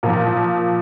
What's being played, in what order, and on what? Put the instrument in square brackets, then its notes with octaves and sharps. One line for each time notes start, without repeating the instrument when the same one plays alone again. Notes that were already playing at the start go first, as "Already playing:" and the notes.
[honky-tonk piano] A#2 F3 A#4